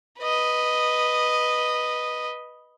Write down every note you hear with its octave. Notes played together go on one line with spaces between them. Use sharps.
B4 D#5